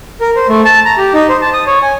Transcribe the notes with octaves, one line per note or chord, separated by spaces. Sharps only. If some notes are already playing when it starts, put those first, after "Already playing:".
A#4
C5
A3
A5
A#5
G4
D#4
C5
A5
D#6
C#5
G#5